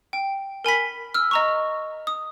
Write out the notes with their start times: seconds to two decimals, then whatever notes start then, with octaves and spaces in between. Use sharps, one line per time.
0.13 G5
0.65 A#4 G#5 B5 B6
1.14 E6 F6
1.31 D#5 A#5 C#6
2.07 D#6